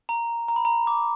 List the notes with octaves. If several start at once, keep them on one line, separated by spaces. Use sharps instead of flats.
A#5
A#5
B5
A#5
D6